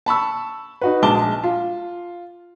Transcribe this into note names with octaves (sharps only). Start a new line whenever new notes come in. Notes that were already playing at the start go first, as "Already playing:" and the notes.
A5 B5 C#6 E6
D#4 F#4 B4
A#1 G#3 A5 D6 G7
F4